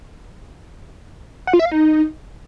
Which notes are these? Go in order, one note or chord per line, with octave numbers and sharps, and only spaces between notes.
F#5
F4
E5
F5
D#4